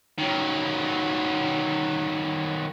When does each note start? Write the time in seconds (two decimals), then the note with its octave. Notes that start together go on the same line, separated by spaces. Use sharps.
0.18 D#3 F#3